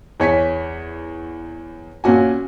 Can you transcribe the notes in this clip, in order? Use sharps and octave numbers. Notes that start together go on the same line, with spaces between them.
E2 C#5 G#5 B6
A#2 C#4 F#4 G#5